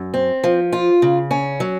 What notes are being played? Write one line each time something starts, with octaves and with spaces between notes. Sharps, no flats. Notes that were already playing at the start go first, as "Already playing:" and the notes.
Already playing: F#2
C4
F3
F4
C#3
C#4
F#3